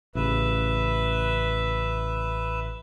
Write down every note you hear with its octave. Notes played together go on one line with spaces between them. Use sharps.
A1 C#3 B4 E5